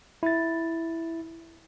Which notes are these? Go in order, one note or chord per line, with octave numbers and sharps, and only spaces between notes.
E4 A6